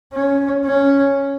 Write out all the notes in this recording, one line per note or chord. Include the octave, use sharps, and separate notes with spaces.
C#4
C#4